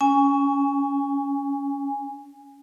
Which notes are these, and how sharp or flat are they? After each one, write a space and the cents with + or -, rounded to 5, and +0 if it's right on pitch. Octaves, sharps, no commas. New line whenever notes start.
C#4 +20 G#5 -15